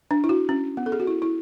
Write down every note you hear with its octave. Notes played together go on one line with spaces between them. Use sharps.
D4
E4
F#4
C#4
B3
A4
G#4
F#4
E4
E4